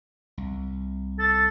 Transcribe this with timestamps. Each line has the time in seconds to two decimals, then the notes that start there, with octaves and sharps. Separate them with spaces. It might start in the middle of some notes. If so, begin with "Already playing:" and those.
0.38 C2
1.19 A4 A6